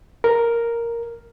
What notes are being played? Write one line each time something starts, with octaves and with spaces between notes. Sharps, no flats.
A#4